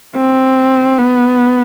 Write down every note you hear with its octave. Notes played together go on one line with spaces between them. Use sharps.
C4
B3